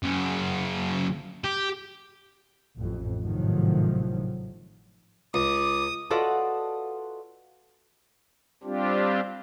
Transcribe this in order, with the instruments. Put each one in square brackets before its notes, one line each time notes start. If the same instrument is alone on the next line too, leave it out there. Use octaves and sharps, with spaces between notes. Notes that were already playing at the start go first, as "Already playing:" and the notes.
[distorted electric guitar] F#2 C#3
G4
[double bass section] A1 F2
G#1 A2 C3 D#3 F3 F#3
[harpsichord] C#2 [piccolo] D6 [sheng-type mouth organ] D#6
[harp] F4 F#4 A4 B4 D5 D#5
[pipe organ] G3 C4 D4 F4 G4